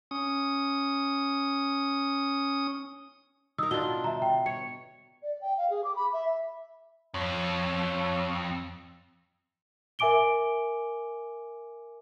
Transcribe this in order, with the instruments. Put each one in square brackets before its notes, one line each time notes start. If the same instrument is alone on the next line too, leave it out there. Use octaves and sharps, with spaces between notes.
[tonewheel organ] C#4 D#6
[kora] D#4 A#4 [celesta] D#6 E6
[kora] B2 D4 F4 [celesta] G7
[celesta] E5 A#5
G5
[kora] C#5 [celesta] C#7
[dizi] D5
G5
F5
G#4
D6
B5
E5
[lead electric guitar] F2 [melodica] C#5
[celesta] A#4 E5 G#5 D6 D7 G7